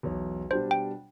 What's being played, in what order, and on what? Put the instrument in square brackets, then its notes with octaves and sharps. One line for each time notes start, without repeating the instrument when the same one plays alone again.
[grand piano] B1 E2 C#5
[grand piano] B2 G3 D4 [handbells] C5
[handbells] G5